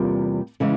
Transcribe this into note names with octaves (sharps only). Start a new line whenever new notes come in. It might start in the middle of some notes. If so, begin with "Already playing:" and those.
Already playing: E2 C3 G3 A#3 F4
C#3 E3 G#3